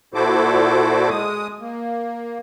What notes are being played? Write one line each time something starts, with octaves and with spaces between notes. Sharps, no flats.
A#2 E4 F#4 A4 C5 D6
G#3 D#6
A#3